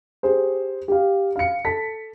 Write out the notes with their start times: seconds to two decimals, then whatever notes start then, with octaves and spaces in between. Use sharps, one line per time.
0.23 G4 G#4 C5
0.88 G4 F5
1.36 F5 C#7
1.65 A4 A5 B6